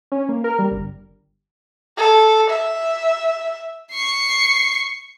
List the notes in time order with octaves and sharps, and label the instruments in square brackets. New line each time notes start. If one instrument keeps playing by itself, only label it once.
[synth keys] C#4
A#3
A#4
G3
G1
[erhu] A4
E5
[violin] C#6 C7